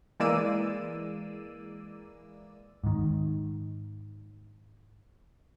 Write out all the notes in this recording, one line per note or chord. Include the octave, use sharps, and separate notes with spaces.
E3 G#3 A#3 D5 E6 D#7
G#2 D#3